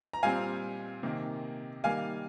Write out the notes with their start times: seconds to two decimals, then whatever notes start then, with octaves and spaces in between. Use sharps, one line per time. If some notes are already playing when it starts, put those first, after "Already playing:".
0.13 A#5
0.23 A#2 G3 C4 F5 G#5
1.03 C3 D#3 A#3
1.84 D#3 G3 A#3 F5 G#5